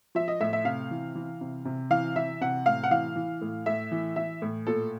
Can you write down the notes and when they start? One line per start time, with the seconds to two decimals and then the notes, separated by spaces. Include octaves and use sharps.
0.15 F3 E5
0.28 D#5
0.40 A2 E5
0.53 E5
0.65 C3 F5
0.91 E3
1.15 E3
1.41 C3
1.65 C3
1.90 E3 F5
2.16 E3 E5
2.41 C3 F#5
2.66 A2 F5
2.83 F#5
2.91 E3 F5
3.16 E3
3.41 A2
3.66 A2 E5
3.92 E3
4.16 E3 E5
4.42 A2
4.67 A#2 A4